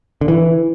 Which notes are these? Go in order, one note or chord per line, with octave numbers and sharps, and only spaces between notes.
D3
E3